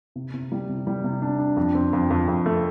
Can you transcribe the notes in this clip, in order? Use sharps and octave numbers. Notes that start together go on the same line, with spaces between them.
C3
C3
G3
C3
G3
C3
D4
D4
F2
C4
F2
F2
F2
A3